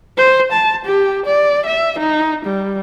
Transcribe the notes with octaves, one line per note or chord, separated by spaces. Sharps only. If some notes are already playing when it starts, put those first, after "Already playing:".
C5
A5
G4
D5
E5
D#4
G3